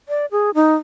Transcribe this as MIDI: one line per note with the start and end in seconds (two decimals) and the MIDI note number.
0.09 0.26 74
0.32 0.50 68
0.55 0.75 63